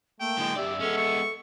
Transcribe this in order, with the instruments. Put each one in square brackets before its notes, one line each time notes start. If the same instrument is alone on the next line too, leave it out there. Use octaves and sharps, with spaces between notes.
[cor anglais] A3 [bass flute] A#3 [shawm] G5
[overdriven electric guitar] A2 D3 [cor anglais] G#3
[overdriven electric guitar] F#2 D5 [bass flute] G4 [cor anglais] E5
[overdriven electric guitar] G#3 B3 [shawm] C#4 [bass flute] A4
[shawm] C#6